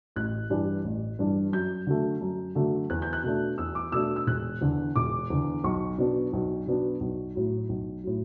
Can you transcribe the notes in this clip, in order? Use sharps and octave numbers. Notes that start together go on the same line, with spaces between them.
A1 F#6
G2 E3 G3 D4
A1
G2 E3 G3 D4
F#2 G6
D3 F#3 A3
F#2
D3 F#3 A3
E2 F#6
G6
F#6
B2 A3 D4
E2 E6
D6
B2 A3 D4 E6
E6
E1 F#6
E2 D3
E1 D6
E2 D3
B1 C#6
B2 F#3 B3 D4
B1
B2 F#3 B3 D4
B1
A2 F#3
B1
A2 F#3